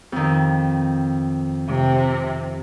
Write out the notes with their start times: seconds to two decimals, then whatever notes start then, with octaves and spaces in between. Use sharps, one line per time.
0.12 F2 D#3
1.68 C3